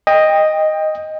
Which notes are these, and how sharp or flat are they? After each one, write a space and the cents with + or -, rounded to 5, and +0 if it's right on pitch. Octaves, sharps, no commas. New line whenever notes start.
D#5 +0 G5 +20